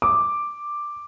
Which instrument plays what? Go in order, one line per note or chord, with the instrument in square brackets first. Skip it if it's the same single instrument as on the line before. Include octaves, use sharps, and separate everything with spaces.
[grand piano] D6